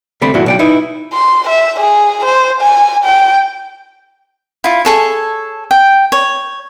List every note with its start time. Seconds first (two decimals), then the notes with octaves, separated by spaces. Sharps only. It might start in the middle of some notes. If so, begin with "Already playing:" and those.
0.21 C2 D3 A3 C4 B5
0.34 G2 A#2 E3 A3 E4 F#4
0.46 B1 D5 G5
0.59 D#4 E4 B4
1.13 C6
1.50 E5
1.80 G#4
2.25 C5
2.61 G#5
3.05 G5
4.64 E4 F4
4.85 G#4 A4 C#5
5.71 G5
6.12 C#5